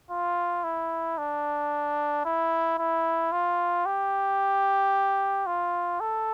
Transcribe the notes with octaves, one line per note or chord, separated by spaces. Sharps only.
F4
E4
D4
E4
E4
F4
G4
F4
A4